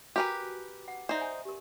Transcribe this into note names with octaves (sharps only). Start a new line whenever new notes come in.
F#4 G4 A#4 B4 G#5
F#5
D#4 C5 D5 E5
G#5
G4 A#4